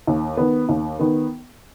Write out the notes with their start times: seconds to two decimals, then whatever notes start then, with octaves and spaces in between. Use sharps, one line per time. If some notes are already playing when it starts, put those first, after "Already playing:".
0.07 D#2
0.37 D#3 B3
0.69 D#2
0.99 D#3 B3